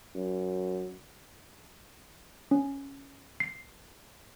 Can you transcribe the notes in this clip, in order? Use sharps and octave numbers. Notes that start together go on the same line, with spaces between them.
F#2
C#4
C7